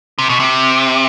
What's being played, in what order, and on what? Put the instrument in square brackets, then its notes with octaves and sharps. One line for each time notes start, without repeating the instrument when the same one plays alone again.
[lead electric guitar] C3
B2
C3